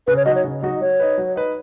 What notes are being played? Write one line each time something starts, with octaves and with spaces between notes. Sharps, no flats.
C#3 B4
C#5
F#3 D#4 F#4 D#5
C#5
C#3
F#3 D#4 F#4 D#5
F#3 C#5
D#4 B4
F#3
D#4 B4